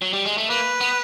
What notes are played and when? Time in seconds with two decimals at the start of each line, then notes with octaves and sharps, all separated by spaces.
0.02 F#3
0.13 G3
0.26 G#3
0.38 A3
0.49 A#3 B4
0.81 B3